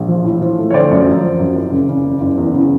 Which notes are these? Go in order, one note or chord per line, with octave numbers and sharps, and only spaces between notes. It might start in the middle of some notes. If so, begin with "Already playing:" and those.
Already playing: A#1
F3
A2
F3
A3
C#5
D3 C5 D5
F#2
F3
F3
F#2
F#1
C#3
C#3
F#1
F#1
E2
C#3